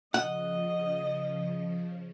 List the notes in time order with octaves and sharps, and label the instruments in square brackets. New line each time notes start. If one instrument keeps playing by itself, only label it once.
[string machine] C#3 F3 [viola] D#5 [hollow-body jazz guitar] F#5